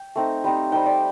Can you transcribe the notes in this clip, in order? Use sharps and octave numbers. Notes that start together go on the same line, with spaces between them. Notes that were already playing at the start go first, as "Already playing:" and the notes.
Already playing: G5
A3 C4 D#4
G3 C4 D#4
G3 C4 D#4 G5
D5